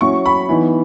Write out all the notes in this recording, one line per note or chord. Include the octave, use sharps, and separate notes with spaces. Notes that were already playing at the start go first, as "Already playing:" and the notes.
F#3 C#4 E4 C#6
B5
E3 B3 D#4